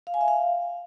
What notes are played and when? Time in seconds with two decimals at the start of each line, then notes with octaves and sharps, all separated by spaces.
0.07 F5
0.14 G#5
0.21 E5
0.28 F5